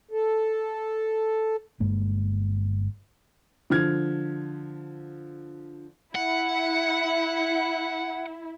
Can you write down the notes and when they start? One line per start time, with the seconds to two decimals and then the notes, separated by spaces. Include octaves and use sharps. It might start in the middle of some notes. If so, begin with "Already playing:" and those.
0.11 A4
1.80 G1 G2 G#3 A#3
3.70 D3 F3 F6 G#6
6.15 E4 F#5